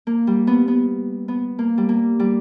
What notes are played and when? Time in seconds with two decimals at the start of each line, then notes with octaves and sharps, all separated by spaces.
0.07 A#3
0.27 G3
0.47 B3
0.68 B3
1.28 B3
1.59 A#3
1.78 G3
1.89 A#3
2.19 G3